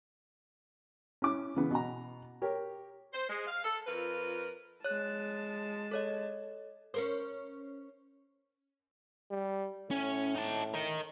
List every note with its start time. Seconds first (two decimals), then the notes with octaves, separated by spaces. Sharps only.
1.22 C#4 E4 D6
1.56 C#3 E3 B3
1.71 B2 A#5
2.42 G4 A#4 C#5
3.13 C5
3.29 G#3
3.47 F5
3.64 A4
3.85 F2 F4 A#4 B4
4.84 G#3 C#5 A5 F#6
5.91 A4 C#5 D#5
6.94 C#4 A#4 C5
9.31 G3
9.91 A2 C#4
10.35 D#4 A5
10.74 A#4 D#5